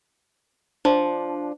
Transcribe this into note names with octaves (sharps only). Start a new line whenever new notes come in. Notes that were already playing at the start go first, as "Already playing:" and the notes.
F3 D4